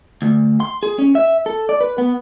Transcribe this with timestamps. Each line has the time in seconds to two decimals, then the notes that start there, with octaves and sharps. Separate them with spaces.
0.22 D2
0.60 C6
0.83 G#4
0.99 C#4
1.15 E5
1.46 A4
1.69 D5
1.81 B4
1.98 B3